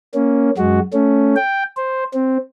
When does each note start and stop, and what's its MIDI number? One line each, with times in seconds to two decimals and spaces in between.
0.14 0.50 58
0.14 0.50 61
0.58 0.80 42
0.58 0.80 56
0.58 0.80 66
0.93 1.35 57
0.93 1.35 61
1.36 1.63 79
1.77 2.04 72
2.14 2.38 60